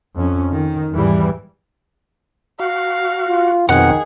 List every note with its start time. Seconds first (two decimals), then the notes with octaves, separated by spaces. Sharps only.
0.15 F2 C#4
0.53 D#3
0.93 E2 G#2 E3 G3
2.60 F#4 F5
3.29 F4
3.69 F2 B2 D#3 C4 G#4 F#5